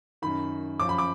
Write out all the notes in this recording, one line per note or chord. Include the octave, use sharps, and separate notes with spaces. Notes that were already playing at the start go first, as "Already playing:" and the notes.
F#2 D#3 B5
F#2 F3 D6
B5
D6